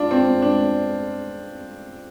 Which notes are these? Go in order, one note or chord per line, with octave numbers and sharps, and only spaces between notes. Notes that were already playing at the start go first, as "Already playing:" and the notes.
Already playing: D4 F4
C4
D4